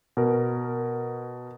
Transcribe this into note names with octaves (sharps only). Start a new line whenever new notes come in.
B2 A#4